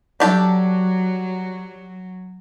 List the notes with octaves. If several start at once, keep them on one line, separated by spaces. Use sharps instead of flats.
F#3 D4 G4 A4